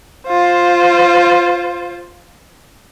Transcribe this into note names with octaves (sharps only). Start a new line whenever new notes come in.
F4 C5